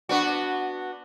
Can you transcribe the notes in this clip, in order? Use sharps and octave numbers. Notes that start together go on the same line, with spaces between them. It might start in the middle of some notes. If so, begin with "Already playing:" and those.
B3 D4 F#4